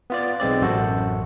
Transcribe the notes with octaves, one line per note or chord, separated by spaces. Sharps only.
B3 F4 D5
B1 G#3 C4 D5
A1 F#2 F#4 A4 C5